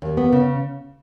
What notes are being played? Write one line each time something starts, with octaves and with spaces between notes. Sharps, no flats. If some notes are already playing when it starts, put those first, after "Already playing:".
D#2
B3
C#3